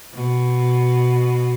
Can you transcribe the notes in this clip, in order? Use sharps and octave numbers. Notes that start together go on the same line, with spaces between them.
B2